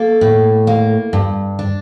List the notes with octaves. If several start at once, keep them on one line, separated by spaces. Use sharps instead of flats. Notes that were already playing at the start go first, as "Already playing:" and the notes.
Already playing: A#3 A4
A2
A#3
G2
D4